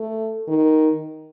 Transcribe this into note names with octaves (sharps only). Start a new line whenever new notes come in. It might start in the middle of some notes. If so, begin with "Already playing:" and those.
Already playing: A3
D#3